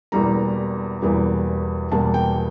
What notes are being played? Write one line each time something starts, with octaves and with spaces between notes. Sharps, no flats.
E1 E2 E3 G3 A#3 A#5
E1 E2 E3 G3 A#3
E1 E2 E3 G3 A#3 A5
G5